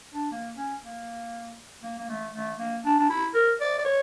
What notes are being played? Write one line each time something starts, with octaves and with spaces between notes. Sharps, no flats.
D4
A#3
C#4
A#3
A#3
A#3
A3
A3
A#3
D4
D4
E4
A#4
D5
D5
C#5